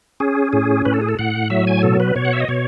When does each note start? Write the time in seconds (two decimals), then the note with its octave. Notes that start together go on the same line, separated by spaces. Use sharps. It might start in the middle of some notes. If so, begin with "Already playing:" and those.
0.20 C#4 G#4
0.53 A2 G#4
0.85 A2 B4
0.94 A4
1.01 G#4
1.09 A4
1.19 A2 F#5
1.50 F#3 E5
1.67 G#5
1.83 B2 A4
2.00 B4
2.15 B2 C#5
2.25 F#5
2.33 E5
2.40 D#5
2.48 B2 C#5